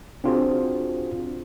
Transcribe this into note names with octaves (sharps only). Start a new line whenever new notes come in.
C4 D4 F4 F#4 G#4 C5